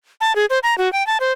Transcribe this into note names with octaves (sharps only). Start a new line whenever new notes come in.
A5
G#4
C5
A#5
F#4
G5
A5
C5